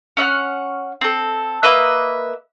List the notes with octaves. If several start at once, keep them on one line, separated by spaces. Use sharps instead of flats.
C#4 E5 F#5 F6
C4 A4
A#3 B4 D#5 E5